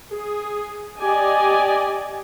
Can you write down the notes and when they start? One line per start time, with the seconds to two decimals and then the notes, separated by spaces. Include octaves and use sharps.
0.15 G#4
0.99 G4 D5 D#5 G#5